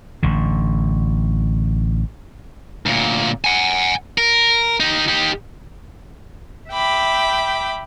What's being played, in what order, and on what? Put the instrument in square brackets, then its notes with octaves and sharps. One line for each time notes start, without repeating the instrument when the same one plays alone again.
[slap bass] A1 D3
[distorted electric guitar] D2 A#2
F#5 G#5
A#4
D#4 G4
D#4 G4
[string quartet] E5 G5 B5 D6